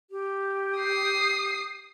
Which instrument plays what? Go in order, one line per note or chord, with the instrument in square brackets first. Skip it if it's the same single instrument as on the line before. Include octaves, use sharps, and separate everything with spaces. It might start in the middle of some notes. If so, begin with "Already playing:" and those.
[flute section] G4
[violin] D#6 C7